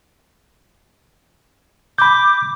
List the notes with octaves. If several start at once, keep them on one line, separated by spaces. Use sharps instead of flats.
B5 D6 G6